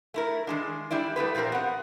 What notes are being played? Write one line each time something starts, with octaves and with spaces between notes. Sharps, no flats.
A3 E4 A#4
D#3 G#3 D4
G3 D4 E4 D5
G3 A3 B3 B4
A#2 F3 C4 G4 A#4
B3 F#5